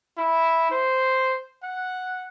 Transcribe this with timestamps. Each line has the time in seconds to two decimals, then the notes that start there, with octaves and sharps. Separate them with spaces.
0.18 E4
0.71 C5
1.64 F#5